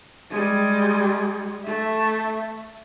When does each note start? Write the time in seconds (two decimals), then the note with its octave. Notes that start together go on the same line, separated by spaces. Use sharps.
0.31 G3 G#3
1.63 A3 E5